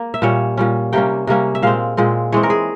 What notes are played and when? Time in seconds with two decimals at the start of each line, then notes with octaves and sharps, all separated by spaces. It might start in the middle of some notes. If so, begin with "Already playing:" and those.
Already playing: A#3
0.14 E5
0.22 A#2 G3 C#4 C#5
0.57 A#2 G3 C#4
0.93 C3 G3 A#3 C#4 G5
1.27 C3 G3 A#3 C#4
1.55 E5
1.62 A#2 G#3 C4 F5
1.97 A#2 G#3 C4
2.32 E3 G#3 C4 C#5
2.43 A#4
2.50 G#4